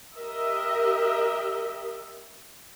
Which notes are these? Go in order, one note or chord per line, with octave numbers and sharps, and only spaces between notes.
G4 A#4 D#5 E5